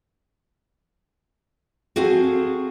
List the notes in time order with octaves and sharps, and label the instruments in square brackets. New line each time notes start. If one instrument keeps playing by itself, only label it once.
[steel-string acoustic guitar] C4 F#4 G#4 A4 F5 G#5